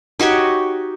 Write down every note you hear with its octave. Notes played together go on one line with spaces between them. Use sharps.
D#4 F#4 G4 C#5